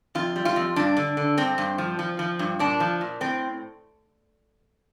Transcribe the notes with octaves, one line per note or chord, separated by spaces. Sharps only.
F2 F4
G3
F4
F2
G2 D4
D3
D3
G2 C4
G2
F3
F3
F3
G2
A#2 D4
F3
A#2
A2 C4